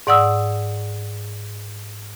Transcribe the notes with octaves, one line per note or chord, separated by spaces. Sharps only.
G#2 D5 F#5 D#6 E6